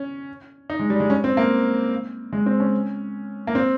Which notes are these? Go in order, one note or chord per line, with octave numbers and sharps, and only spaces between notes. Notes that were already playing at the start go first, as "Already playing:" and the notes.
Already playing: C#4
D#4
G#3
G3
G#3
C#4
C4
A#3
G#3
C4
C#4
A#3
C4